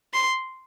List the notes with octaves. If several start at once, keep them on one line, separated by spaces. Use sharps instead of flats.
C6